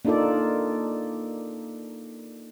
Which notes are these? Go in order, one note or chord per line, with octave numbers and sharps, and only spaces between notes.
A#3 D4 D#4 F4 A4 D5